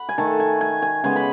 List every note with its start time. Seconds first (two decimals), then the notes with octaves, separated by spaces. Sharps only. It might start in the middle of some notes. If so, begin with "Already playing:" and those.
Already playing: F#5 B5
0.09 G#5
0.18 D#3 A3 A5
0.40 G#5
0.61 G#5
0.82 G#5
1.04 C#3 G#3 B3 G#5
1.16 B5